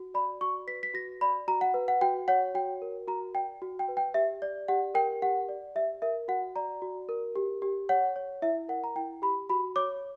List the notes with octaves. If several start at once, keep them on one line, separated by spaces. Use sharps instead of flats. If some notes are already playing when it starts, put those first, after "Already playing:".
Already playing: F#4
D5 B5
F#4 C#6
B4 B6
B6
F#4 A#6
D5 B5
F#4 A#5
F#5
B4
F#5
F#4 G5
C#5 F#5
F#4 G5
A#4
F#4 A#5
D5 G5
F#4
G5
B4
G5
G4 E5
D5
G4 F#5
A#4 G5
G4 F#5
D5
G4 E5
A#4 E5
F#4 F#5
D5 A#5
F#4
A#4
G4
G4
C#5 F#5
C#5
E4 E5
A#4 F#5
A#5
E4 G5
G4 B5
F#4 B5
C#5 D6